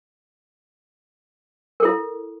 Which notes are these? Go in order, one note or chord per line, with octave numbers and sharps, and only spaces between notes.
E4 A4 A#4